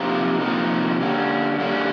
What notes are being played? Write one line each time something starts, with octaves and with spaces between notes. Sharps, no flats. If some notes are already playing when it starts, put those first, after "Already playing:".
Already playing: C3 F3 A#3 D#4
C3 F3 A#3 D#4
D3 G3 A#3 C#4
D3 G3 A#3 C#4